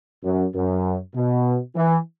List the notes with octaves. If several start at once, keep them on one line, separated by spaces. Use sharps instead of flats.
F#2
F#2
B2
E3